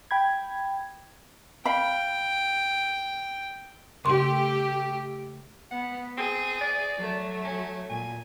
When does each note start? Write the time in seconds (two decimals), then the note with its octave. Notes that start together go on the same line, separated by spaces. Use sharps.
0.11 G5 B5 G#6
1.65 F5 G5 B5
4.05 C#3 A3 G4 C6
5.71 B3 F#5
6.17 C4 G#4
6.61 D5
6.96 F#3 A3
7.44 C#4
7.89 A#2 G#5